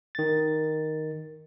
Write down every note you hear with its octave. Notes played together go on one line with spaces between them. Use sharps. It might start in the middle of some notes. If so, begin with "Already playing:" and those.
D#3 A6